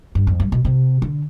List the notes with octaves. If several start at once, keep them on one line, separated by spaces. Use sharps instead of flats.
G2
F2
G2
B2
C3
D3